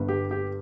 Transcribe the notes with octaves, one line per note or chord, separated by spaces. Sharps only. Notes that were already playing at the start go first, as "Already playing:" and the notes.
Already playing: G1 G2 G3 B3
G4
G4